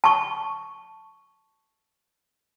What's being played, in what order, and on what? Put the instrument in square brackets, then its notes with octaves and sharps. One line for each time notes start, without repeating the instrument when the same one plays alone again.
[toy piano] A5 C#6